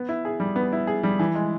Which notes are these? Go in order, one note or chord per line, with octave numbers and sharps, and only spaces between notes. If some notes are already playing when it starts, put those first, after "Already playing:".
Already playing: B3
E4
G#4
G3
B3
E4
G#4
G3
E3
G#3